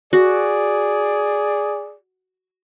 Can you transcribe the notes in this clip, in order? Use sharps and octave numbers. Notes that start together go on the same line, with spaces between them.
F#4 G#4 D5